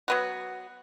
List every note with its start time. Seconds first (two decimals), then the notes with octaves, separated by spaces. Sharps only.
0.08 F#3 B3 F#4